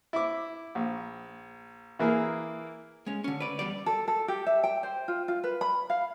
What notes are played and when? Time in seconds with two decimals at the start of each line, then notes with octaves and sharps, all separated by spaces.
0.13 E4 D6
0.75 A#1
1.99 E3 A#3 E4 G#4 A#4
3.06 G#3 C#4
3.24 D3 C#4
3.40 B4 D5
3.59 E2 G3 D5
3.86 A4
4.08 A4
4.28 G4
4.46 E5
4.64 G5
4.83 C5
5.08 F4
5.28 F4
5.44 B4
5.61 B5
5.90 F5